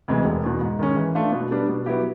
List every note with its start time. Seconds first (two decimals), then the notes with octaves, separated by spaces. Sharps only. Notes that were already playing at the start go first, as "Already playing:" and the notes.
0.08 D2 C3 E3 G#3
0.25 E1
0.43 E2 B2
0.61 G#2
0.79 D#3 G#3 C#4
0.96 E3
1.15 A3 D4 F4
1.32 B2
1.51 G3 B3 D4
1.69 B2
1.86 F#3 B3 E4 G4